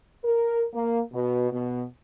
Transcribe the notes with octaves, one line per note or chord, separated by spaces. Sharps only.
A#4
A#3
B2
B2